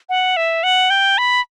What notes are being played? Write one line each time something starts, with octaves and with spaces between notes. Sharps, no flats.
F#5
E5
F#5
G5
B5